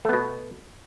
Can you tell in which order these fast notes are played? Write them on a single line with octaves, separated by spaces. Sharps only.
A3 B3 B2